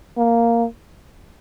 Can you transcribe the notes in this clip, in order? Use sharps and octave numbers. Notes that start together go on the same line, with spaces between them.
A#3